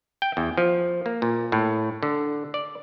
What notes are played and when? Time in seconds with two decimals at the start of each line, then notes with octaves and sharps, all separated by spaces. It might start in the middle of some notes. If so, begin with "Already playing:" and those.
0.22 G5
0.37 E2
0.58 F3
1.06 A#3
1.22 A#2
1.52 A2
2.03 D3
2.54 D5